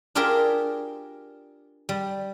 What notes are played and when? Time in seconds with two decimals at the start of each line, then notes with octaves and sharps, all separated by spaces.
0.15 D4 F4 G4 G#4 A#4 E5
1.89 G3